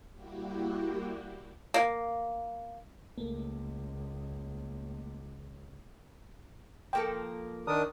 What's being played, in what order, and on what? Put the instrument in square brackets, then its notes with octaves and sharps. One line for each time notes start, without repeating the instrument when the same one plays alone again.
[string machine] G3 A#3 E4 F#4 G4
[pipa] A#3
[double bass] C#2 [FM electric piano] A3 A#3
[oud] F3 A#3 A4 [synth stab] G5
[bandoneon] D#3 D4 D#6 [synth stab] A#4